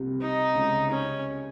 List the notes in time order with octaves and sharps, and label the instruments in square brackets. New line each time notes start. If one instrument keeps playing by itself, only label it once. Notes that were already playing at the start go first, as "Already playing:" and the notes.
Already playing: [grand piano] C2 C3
[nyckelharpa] D#4
[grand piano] C#2 C#3
[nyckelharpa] C#4